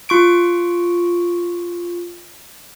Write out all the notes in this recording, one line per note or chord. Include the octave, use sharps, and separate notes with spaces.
F4 C#6 D7